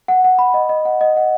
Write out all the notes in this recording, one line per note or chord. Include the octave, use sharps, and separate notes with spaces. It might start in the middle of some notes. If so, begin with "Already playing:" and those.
F#5
F#5
B5
D#5
D#5
F#5
D#5
F#5